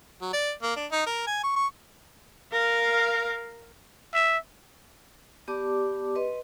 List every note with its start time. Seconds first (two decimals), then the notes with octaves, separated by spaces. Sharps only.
0.21 F#3
0.33 D5
0.63 A#3
0.76 D4
0.91 D#4
1.06 A#4
1.27 G#5
1.43 C#6
1.56 C#6
2.52 A#4 F5
4.14 E5
5.48 B3 G4 D5 A5 D6
6.15 B4 D#5 C6